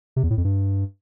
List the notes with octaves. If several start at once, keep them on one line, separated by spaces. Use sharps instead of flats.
C3
E2
A2
F2
G2